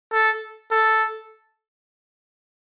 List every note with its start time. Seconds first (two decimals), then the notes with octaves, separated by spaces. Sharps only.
0.13 A4
0.71 A4